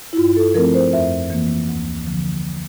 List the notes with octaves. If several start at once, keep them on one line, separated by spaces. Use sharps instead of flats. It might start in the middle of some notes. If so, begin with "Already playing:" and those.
E4
G2 F4
A4
F3 A3 C4 A#4
A#4
C5
F2 E5
E3 A#3
D2
D3 F3